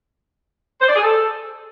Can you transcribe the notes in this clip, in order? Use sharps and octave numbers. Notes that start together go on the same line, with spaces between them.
C5
D5
G#4
A4